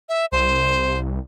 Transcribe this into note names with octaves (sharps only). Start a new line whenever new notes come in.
E5
C2 C5